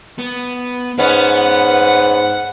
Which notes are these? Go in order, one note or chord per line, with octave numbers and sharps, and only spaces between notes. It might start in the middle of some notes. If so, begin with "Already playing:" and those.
B3
G#2 B3 C#4 B4 F#5